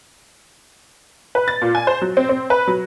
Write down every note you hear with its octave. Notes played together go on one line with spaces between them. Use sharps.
B4
A6
A#2
G#5
C5
F#3
C4
C4
B4
F#3